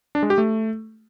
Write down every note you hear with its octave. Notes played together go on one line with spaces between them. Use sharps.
D4
G#3
G4
A3